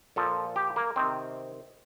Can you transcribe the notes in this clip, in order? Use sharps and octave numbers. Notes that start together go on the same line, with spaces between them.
A#2 F3 A4
G4
A#3
C3 D#3 C4